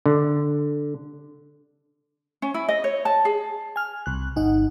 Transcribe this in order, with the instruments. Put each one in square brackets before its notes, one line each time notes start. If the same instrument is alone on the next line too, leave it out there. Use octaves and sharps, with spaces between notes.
[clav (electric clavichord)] D3
[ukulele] C#4
E4
D#5
C#5
A5
G#4
[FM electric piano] G#5 F6
C2 F#6
G1 D#4 F#5